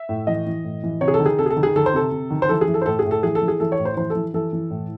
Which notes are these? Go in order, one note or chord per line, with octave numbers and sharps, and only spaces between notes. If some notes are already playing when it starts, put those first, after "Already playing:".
Already playing: E5
A2
E3 D#5
E3
A2
E3
C3 C#5
G#4
A4
D#3
G#4
C3 A4
G#4
A4
D#3
G#4
D#3 A4
C5
C3 A4
C3
D#3
C5
E3 A4
G#4
E3
A4
C5
A2 A4
G#4
A2
A4
E3 G#4
A4
E3
G#4
E3 A4
C#5
A2
C5
E3 C5
A4
E3
E3 A4
E3
A2